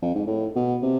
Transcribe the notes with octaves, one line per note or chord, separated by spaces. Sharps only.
F2
G#2
A2
B2
C3